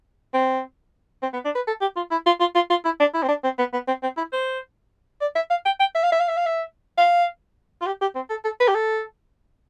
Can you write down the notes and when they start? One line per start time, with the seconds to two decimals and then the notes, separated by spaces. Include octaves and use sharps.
0.34 C4
1.23 C4
1.33 B3
1.45 D4
1.55 B4
1.67 A4
1.81 G4
1.96 F4
2.11 E4
2.26 F4
2.40 F4
2.55 F4
2.70 F4
2.85 E4
3.00 D4
3.14 E4
3.23 C4
3.28 D4
3.44 C4
3.59 B3
3.73 B3
3.88 C4
4.03 C4
4.17 E4
4.33 C5
5.21 D5
5.35 E5
5.50 F5
5.65 G5
5.80 G5
5.95 E5
6.03 F5
6.12 E5
6.20 F5
6.28 E5
6.37 F5
6.46 E5
6.98 F5
7.82 F4
7.86 G4
8.01 G4
8.15 C4
8.30 A4
8.45 A4
8.60 B4
8.68 G4
8.75 A4